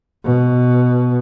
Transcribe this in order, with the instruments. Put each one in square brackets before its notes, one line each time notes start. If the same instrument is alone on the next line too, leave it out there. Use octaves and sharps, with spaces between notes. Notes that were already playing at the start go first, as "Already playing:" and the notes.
[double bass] B2